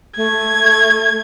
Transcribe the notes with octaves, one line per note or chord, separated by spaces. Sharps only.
A3 G#6